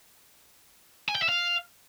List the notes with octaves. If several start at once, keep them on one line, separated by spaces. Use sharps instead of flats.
G#5
G5
E5
F5